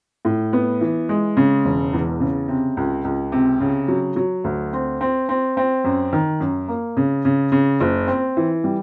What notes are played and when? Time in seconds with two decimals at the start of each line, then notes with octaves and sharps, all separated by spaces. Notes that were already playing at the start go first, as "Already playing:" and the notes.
0.25 A2
0.53 B3
0.81 E3
1.09 G#3
1.37 C#3
1.65 E1
1.93 E2
2.20 C#3
2.48 C3
2.77 C#2
3.04 C#2
3.32 C3
3.60 C#3
3.88 F#3
4.16 F#3
4.44 D2
4.73 C4
5.01 C4
5.29 C4
5.57 C4
5.84 F#2
6.13 D#3
6.40 F#2
6.68 A#3
6.97 C#3
7.25 C#3
7.52 C#3
7.80 F#1
8.08 C4
8.37 E3
8.64 G3